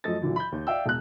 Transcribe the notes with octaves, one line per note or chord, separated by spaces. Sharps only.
F#2 F3 A3 A4 D#5 A6
D2 A#2 D3 E3 F#3
B5 G6
D#2
D5 E5 F5 G5 E6
E1 F#6